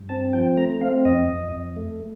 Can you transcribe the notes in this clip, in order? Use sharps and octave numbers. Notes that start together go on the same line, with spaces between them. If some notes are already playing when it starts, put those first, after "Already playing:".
Already playing: G2
C4 A5
F3 G5
A3 A#5
C4 F5
F2 D#5
F2
F2
A3